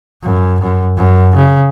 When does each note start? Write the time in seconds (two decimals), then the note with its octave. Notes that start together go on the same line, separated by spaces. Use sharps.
0.23 F#2
0.61 F#2
0.97 F#2
1.35 C#3